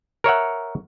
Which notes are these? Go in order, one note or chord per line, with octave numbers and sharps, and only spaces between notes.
A#4 C#5 E5 F#5